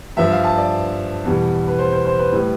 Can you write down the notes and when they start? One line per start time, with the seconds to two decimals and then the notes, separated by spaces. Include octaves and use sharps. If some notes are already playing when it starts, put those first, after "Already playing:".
0.17 G2 F3 E5
0.31 F5
0.44 A5
0.58 D5
1.25 E2 B2 G3
1.68 B4
1.79 C5
1.92 C5
2.06 C5
2.19 B4
2.32 A2 G3